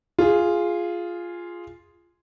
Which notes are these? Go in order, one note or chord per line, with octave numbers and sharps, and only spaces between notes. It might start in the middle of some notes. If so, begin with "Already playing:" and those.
F4 G#4